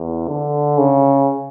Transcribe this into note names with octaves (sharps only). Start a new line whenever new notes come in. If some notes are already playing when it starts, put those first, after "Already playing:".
Already playing: E2
D3
C#3